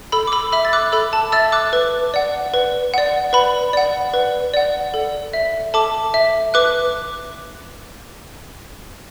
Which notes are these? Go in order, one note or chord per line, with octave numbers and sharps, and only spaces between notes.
A4 B5 E6
D6
B5 E6
E5 B5 E6
A6
D6 F#6
A4 B5 E6
A5
E5 E6 A6
D6 F#6
B4
D5 F#5
B4
D5 F#5
B4 B5
D5 F#5
B4
D5 F#5
A4
E5
A4 A5 D6
E5
B4 D6 F#6